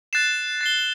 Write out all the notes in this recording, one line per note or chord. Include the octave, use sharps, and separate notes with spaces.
F#6 A6 C7 E7
A6 C7 G7